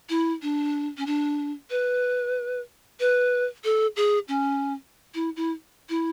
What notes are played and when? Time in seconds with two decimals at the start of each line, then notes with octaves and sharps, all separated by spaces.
0.09 E4
0.42 D4
0.98 C#4
1.06 D4
1.70 B4
3.00 B4
3.64 A4
3.96 G#4
4.28 C#4
5.15 E4
5.36 E4
5.89 E4